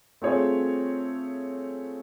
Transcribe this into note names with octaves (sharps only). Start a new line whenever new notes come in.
A3 C4 F4 G#4 C#5